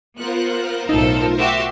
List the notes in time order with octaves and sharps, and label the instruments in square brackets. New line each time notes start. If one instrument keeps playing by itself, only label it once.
[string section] B3 F#6 [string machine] F4 A#4 C5
[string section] B1 A2 A4 [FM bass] D#4
[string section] F#4 G4 E5 [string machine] C6